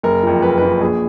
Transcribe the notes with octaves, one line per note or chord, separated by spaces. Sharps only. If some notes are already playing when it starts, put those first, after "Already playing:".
F#1 A#4
F2 F3
F#1 B4
A#4
F2 F3 B4
A#1 G#4